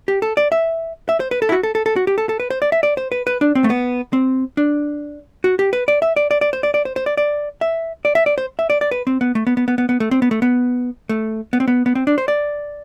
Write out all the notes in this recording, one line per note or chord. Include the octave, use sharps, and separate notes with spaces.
G4
A4
D5
E5
E5
C5
B4
A4
E4
F#4
A4
A4
A4
F#4
G4
A4
A4
B4
C5
D5
E5
D5
C5
B4
B4
D4
C4
A3
B3
C4
D4
F#4
G4
B4
D5
E5
D5
D5
D5
C5
D5
D5
C5
C5
D5
D5
E5
D5
E5
D5
C5
E5
D5
D5
B4
C4
B3
A3
B3
B3
B3
B3
B3
A3
C4
B3
A3
B3
A3
B3
C4
B3
B3
C4
D4
C5
D5